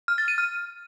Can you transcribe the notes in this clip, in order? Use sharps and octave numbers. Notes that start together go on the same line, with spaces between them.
F6
A6
D#7
F6